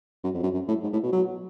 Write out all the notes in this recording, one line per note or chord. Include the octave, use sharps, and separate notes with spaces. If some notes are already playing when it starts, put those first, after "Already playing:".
F#2
F2
F#2
F#2
A2
G#2
A2
B2
F#3